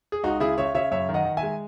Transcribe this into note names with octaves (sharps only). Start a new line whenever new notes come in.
G#4
C#2 D#4 F#4
C#3 E4 G#4
C#3 C#5 E5
C#3 C#5 E5
F#2 C#5 E5
D#3
D#5 F#5
D#3
E5 G#5
G#3